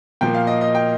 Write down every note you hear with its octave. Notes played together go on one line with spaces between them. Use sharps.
A#2 F3 A#3 G5
F5
D#5
D#5
G5